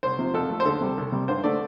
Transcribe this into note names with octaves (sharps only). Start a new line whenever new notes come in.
C2 C5
C3 F3
F2 A4
F3 A3
C5
D2 A4
C3 G3
C2
C3 G3
G2 C5
D3 A3 D5